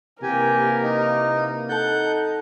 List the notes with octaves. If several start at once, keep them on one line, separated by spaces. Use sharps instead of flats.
C3 E3 A#3 G4 A#4 G#5
D#4
D#4 A4 F#5 A5 G6